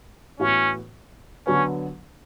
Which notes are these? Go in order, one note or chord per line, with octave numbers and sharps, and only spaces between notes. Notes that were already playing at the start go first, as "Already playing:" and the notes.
A2 E3 B3 C#4 F#4
D3 F#3 B3 C#4